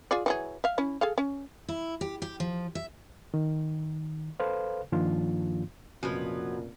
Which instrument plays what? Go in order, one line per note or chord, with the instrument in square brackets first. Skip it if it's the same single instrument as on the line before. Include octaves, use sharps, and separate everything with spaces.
[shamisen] F4 G#4 D5
E3 F#3 G#4
E5 F5
C#4 E4
G#4 A4 F5
C#4
[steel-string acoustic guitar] E4
G4
G4
F3
E5
[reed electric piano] D#3
A4 B4 C5 F5
G2 D#3 F3 A#3 D4 F4
[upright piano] F1 C#3 [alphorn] A#2 [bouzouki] F3 F#3 B4 [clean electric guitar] F#4 D#5